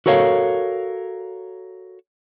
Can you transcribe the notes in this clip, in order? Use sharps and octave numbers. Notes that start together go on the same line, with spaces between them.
F#4 A4 A#4 C#5 F5